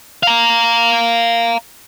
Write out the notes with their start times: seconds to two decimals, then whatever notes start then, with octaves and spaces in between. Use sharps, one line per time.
0.23 F5 A#5